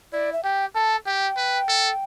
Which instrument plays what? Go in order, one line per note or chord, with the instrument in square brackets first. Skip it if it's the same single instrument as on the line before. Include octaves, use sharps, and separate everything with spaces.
[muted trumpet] E4 [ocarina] D5
[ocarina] E5
[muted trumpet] G4 [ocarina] G5
[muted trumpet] A4 [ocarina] A5
[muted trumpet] G4 [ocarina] G5
[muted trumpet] B4
A4